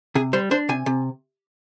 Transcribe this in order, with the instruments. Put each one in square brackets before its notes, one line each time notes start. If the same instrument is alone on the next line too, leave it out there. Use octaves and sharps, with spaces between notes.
[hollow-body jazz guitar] C3 G#4
G3 C5
D4 C5
C3 G#5
C3